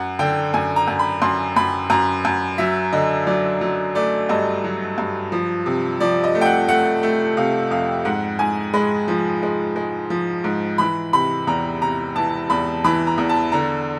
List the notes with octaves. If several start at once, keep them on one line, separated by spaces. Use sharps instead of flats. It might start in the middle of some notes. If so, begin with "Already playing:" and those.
Already playing: F#2 F#5
D3 G5
F#2 G#5
A#5
F#2
B5
F#2 C6
F#2 B5
F#2 A#5
F#2
F#3 E5
D3 D#5
F#3 D5
F#3
A3 D5
G2 D#5
F#3
G2
F3
C3
F3 D5
D#5
A3
G5
F#5
A3 F#5
A3
C3 F5
F2 F5
G#2 F#5
G#2 G#5
G#3 B5
F3
G#3
G#3
F3
G#2
E3 B5
C3 B5
E2 A#5
C3 A#5
E3 A5
E2 B5
E3 B5
A#5
E2
A5
D3 A#5